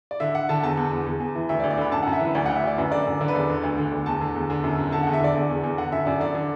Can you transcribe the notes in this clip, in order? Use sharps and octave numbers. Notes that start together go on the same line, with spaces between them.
D5
D3 E5
D3 F#5
D3 A5
E2 A5
E2
E2
E2
E2
E3
D2 E5
D5
D2
D5
D3 B5
F#2 A5
F#2 F#5
E5
E3 B4
D2 D5
D2 F#5
E5
D2 D5
F#2 B4
D3 D5
F#2
D3 D5
B4
E2 D5
D3
D2
D3
D2
E2 A5
D3
E2
D3
F#2
F#2
D3 A5
E2 F#5
E5
D3 D5
E2 D5
E2
E2
D3 F#5
F#2 E5
F#2 D5
D3 D5
D3